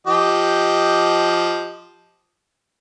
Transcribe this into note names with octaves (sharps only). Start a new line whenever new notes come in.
F3 G4 D#5